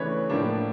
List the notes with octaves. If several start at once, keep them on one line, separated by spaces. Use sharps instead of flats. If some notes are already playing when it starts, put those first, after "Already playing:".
Already playing: C#3 E3 A3 D4 B4 C#5
A2 F3 A#3 D4